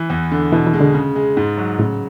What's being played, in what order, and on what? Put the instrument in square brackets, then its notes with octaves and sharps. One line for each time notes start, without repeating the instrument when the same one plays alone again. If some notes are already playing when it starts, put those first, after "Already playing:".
Already playing: [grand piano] E3
E2
D3
[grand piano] B2 [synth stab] E3
[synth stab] E3
[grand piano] G#3
[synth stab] D3
[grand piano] C#3
G#3
G#2
F#3
[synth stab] A2 [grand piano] C#3